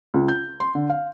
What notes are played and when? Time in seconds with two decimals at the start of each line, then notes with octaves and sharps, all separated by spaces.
0.14 C#2
0.28 G6
0.60 C6
0.75 D3
0.90 F5